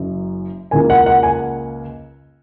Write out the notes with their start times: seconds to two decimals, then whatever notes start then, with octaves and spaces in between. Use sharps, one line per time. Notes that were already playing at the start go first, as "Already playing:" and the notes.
Already playing: F#1 F#2 F#3
0.71 C#2 C#3 A#3 G#5
0.90 F#5
1.06 F#5
1.23 G#5